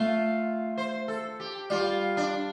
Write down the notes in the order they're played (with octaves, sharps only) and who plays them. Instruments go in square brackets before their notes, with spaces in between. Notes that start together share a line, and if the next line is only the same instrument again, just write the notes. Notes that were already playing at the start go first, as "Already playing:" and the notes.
Already playing: [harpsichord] A3 [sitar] F4
[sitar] C5
A4
G4
[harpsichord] G3 [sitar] F4
[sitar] D4